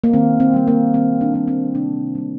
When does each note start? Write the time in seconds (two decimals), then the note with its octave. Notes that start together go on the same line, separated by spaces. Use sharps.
0.04 A#3
0.13 D#3 C4
0.40 C4
0.54 G3 A#3
0.67 A#3
0.94 D#3 C4
1.21 D4
1.34 G3 A#3
1.48 C4
1.74 C3 D4
2.15 G3 A#3